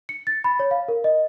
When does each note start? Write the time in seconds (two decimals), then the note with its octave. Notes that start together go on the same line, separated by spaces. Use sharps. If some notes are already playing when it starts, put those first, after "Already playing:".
0.09 C#7
0.27 A6
0.44 B5
0.59 C#5
0.71 F5
0.88 A#4
1.04 D#5